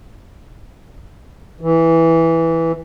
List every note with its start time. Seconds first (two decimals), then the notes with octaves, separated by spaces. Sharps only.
1.61 E3